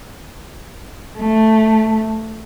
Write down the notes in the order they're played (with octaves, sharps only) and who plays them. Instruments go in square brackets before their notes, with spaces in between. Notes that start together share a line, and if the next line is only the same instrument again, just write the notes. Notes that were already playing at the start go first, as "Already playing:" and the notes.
[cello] A3